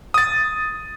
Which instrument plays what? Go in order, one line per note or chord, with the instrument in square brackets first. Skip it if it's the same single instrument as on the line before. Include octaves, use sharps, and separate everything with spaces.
[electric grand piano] D#6 A6